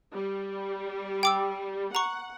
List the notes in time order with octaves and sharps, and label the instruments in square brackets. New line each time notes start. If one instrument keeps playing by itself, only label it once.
[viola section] G3
[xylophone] G5 D6 E6
[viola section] F#5 [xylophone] A#5 C#6